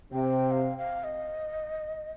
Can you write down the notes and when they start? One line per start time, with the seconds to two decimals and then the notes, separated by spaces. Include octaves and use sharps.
0.12 C3 G5
0.51 F5
0.78 F5
1.04 D#5